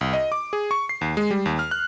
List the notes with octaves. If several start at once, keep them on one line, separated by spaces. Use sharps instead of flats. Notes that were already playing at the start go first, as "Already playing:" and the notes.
C2
D#5
D6
G#4
C#6
C7
D#2
G#3
G3
D#2
F6
F#6